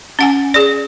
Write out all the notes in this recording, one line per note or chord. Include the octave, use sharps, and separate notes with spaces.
C#4 F#5 G#5
G#4 D5